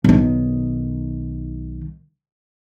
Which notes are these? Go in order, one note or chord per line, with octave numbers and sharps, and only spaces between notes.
B1 D#3